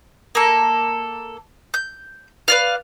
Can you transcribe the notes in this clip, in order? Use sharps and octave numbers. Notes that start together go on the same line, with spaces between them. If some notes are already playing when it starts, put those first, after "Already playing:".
A#3 A4
G6
B4 D5 F5